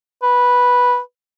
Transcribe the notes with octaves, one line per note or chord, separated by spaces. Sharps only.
B4